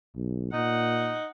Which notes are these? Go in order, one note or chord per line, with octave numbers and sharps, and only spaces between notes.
B1
A#2 D#4 F#5